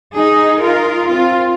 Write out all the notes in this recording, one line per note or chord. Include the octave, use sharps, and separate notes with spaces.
D#4 G#4
F4 A#4
C4 F4